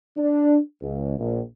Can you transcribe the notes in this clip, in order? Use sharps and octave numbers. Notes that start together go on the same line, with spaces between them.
D4
C#2
A#1